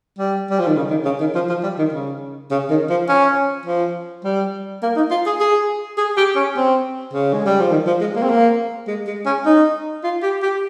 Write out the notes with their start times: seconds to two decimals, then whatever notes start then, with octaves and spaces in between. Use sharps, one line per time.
0.19 G3
0.50 G3
0.59 F3
0.67 D#3
0.77 C#3
0.90 D#3
1.05 C#3
1.20 D#3
1.35 F3
1.49 F3
1.63 G3
1.79 D#3
1.93 C#3
2.51 C#3
2.70 D#3
2.90 F3
3.09 C#4
3.66 F3
4.24 G3
4.83 A#3
4.96 D#4
5.11 F4
5.26 G#4
5.40 G#4
5.98 G#4
6.17 G4
6.36 C#4
6.57 C4
7.13 C#3
7.34 G#3
7.46 G3
7.60 F3
7.71 D#3
7.87 F3
8.01 G#3
8.16 A#3
8.23 C4
8.30 A#3
8.88 G#3
9.07 G#3
9.26 C#4
9.46 D#4
10.04 F4
10.23 G4
10.43 G4